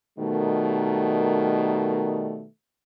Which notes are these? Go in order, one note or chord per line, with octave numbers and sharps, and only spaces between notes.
B2 D#3 G3 A3 A#4